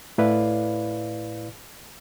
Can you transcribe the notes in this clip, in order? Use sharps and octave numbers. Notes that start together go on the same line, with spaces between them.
A2 E4 B4 D5 F5